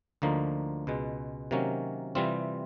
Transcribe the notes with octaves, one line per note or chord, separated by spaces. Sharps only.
D2 D3 F3 A#3 D#4
C#2 B2 G#3
C3 D#3 F#3 A#3 C#4
C3 E3 G3 C4 F4